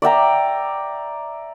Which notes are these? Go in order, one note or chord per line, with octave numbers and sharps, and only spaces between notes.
D5 E5 G5 A#5